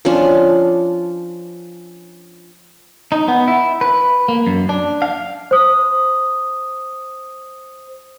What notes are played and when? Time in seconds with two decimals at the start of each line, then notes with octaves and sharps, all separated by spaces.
0.05 F3 C#4 D4 F4
3.12 D#4
3.28 B3
3.48 E4
3.81 B4
4.28 A#3
4.47 F#2
4.69 D4
5.02 F5
5.51 C5 D#6